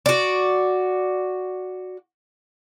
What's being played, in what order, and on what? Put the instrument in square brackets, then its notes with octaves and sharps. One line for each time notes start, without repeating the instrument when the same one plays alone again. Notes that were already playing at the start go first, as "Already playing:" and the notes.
[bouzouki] F#4 D5